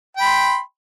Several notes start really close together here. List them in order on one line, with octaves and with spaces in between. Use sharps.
G5 B5 C6